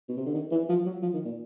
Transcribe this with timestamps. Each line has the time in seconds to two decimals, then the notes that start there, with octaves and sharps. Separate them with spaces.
0.09 B2
0.17 C3
0.26 D3
0.35 D#3
0.51 E3
0.69 F3
0.86 F#3
1.02 F3
1.14 D#3
1.25 A#2